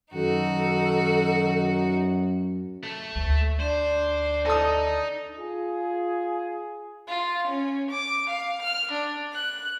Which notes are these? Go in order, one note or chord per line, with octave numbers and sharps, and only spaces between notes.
F#2 D#3 D#4 F#4 A4
A3
D2
D4 C5
D#4 A4 D#6
F4 G#4
F4
C#4
D6
F5
F6
D4
F#6